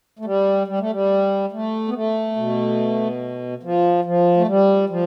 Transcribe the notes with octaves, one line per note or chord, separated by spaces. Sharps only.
A3
G3
G3
A3
G3
A3
B3
A3
B2
F3
F3
A3
G3
F3